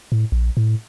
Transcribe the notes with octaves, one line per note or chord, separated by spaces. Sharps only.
A2
A#1
A2